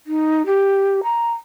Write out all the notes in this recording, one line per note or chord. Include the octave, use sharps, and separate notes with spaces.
D#4
G4
A#5